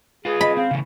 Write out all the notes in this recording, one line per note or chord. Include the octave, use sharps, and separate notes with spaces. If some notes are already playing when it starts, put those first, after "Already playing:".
F4 G#4 B4
D#5 B5
C4 F5
C#3 E3 A3